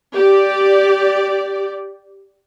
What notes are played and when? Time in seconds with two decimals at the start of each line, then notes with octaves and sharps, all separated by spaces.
0.15 G4 D5